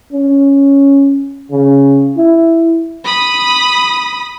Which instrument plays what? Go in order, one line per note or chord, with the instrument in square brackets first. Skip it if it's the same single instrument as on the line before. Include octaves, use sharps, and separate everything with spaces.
[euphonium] C#4
C#3
E4
[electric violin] B5 D#6